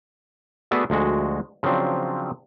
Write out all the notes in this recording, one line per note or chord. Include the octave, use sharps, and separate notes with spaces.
A3 B3 F#4 G#4 D5 E5
D2 F3 G#3 F#4
C#3 F3 F#3 C4 D4